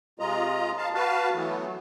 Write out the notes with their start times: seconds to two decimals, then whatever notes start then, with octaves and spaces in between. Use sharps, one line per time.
0.19 C3 G#3 F4 D#5 A#5
0.77 F5 A5
0.94 F#4 B4 F5 A5
1.34 E3 F#3 A3 B3